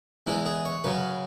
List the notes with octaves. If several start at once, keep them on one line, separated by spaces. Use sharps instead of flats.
E2 E3 G#3 E4
G#4
C#5
F#2 C#3 F#3 B4